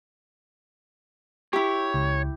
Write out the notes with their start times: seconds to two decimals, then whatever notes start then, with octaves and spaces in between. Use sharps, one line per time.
1.53 E4 G4 C#5
1.94 C#2